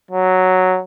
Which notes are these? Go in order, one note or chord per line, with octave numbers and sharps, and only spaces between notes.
F#3